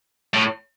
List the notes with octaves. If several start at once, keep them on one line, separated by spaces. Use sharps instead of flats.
A2